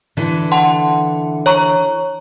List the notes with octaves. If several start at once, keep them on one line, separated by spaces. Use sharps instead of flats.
D3 E3 A4
F#5 A5 C6
C#5 A#5 C#6